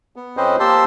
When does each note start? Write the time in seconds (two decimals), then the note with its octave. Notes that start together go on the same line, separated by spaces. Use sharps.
0.16 B3
0.37 F2 C4 C#4 B4 C5 D#5
0.60 A#3 G4 C5 A5 C6 E6